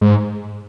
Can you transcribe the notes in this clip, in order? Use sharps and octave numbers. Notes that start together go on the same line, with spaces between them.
G#2